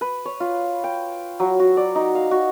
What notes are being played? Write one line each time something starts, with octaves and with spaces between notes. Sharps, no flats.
B4
C#5
F4
G5
F#3
F#4
D5
D#4
F5
F#4